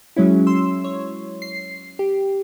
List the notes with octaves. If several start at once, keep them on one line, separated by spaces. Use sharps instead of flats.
F#3 G#3 C#4 E4
C6 E6
C#5
C7
G4